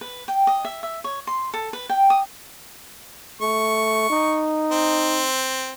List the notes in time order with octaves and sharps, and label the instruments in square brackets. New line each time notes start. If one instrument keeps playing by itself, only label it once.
[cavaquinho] B4
G5
D#5
E5
E5
C#5
C6
A4
B4
G5
D#6
[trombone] A3 [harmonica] C#6
[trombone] D#4
[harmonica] C4